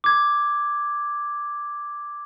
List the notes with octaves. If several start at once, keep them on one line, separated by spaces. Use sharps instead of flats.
D6 G#6